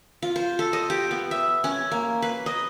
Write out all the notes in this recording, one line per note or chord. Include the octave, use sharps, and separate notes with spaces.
F4
C5
A4
D#5
G4
B3
E5
C#4
A#3
B4
D#5